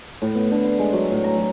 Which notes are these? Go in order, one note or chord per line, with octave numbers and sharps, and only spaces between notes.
A2
B3
D3
C6
G#3
F#3
A2
A#5
F#3